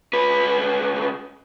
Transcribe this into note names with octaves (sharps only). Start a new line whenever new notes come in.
C#2 B4